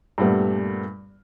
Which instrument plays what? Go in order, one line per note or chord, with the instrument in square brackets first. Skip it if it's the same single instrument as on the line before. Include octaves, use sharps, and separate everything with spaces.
[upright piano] G2 A#2 G3 A3 B3